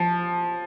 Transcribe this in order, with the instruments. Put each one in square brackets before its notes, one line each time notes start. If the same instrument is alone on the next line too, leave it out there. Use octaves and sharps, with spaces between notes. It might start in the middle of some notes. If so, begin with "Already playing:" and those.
Already playing: [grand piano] F3